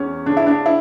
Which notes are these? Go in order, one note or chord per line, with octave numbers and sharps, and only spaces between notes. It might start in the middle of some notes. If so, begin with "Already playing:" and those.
Already playing: E2 C#4
C#3 D4
E4
D4
E4